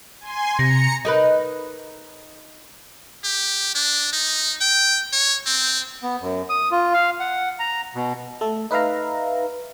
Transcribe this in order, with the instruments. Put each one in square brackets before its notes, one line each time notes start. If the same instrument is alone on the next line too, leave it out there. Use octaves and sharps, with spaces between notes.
[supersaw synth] G#5 C6
[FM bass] C3 [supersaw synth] A#5 C#7 [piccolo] A#6
[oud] D#4 A#4 B4
[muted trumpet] G4
D4
D#4
G5
C#5
C4
[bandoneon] B3
F#2
D#6
F4
F5
F#5
A#5
B2
[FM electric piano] A3 A4
D#4 B4 E5 F5 A#5